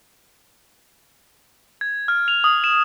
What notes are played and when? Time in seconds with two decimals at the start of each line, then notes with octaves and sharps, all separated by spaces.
1.81 G#6
2.08 F6
2.28 F7
2.44 D#6
2.64 E7